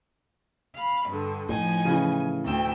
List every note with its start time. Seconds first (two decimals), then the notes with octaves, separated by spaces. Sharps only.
0.75 F5 B5
1.09 G2 D3
1.49 A2 F3 D#4 G#5
1.85 C#3 E3
2.43 D2 G5 E6